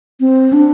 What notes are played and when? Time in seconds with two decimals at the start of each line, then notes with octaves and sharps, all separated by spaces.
0.20 C4
0.53 D4